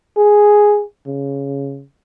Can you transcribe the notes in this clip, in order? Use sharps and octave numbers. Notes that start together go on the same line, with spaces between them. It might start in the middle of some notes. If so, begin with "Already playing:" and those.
G#4
C#3